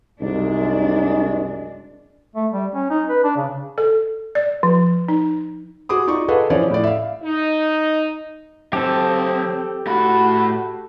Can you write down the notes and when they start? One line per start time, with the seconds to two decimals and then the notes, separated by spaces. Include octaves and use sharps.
0.21 C2 F#2 G#3 D4 D#4
2.36 A3
2.52 G3
2.75 C#4
2.90 D#4
3.09 B4
3.24 D4
3.37 C#3
3.78 A4
4.35 D5
4.63 F3
5.09 D#4
5.89 F#4 G#4 D6 D#6
6.07 D#4 F4 D5 C#6 D6
6.28 G#4 A4 B4 D#5 F5 F#5
6.50 E3 F3 C#4 C#5 D5
6.70 A2 D5
6.84 E5 F5
7.23 D#4
8.73 F#3 C4 G4 A4 A5
9.87 A2 F#4 B5